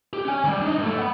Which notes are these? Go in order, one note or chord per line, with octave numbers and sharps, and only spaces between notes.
G4
C#4 G#5
D2 G3
D4 D#4
G2 A3
F#5 B5